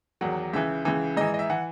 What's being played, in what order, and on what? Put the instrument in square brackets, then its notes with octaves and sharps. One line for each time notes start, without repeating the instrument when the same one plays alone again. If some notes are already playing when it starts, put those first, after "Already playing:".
[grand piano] E2 D#3 F#3 F#5
C#2 C#3 E3 E5
C#2 C#3 E3
G#2 E3 D#5
D#5
E5
E3 F#5